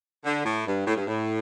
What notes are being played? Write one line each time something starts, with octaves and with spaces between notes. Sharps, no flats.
D3
A2
G2
A2
G2
A2